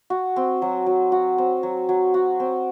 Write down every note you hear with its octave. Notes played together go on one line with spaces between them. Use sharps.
F#4
C4
F#3
F#3
F#4
C4
F#3
F#3
F#4
C4